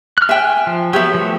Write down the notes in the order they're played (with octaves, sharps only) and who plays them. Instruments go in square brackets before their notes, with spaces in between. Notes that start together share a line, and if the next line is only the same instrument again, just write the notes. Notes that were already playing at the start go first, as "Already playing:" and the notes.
[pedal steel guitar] F6 F#6
[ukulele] E5 G5 [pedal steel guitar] G#5
[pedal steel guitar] F3
[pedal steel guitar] F#3 B3 [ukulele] G4 C#5 E5
[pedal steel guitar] F3 A3